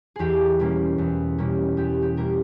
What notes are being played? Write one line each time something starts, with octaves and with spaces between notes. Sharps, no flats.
E2 G4 G#4
B2 G3 A#3 C#4
E2
B2 G3 A#3 C#4
E2 G4
G4
B2 G3 A#3 C#4 A#4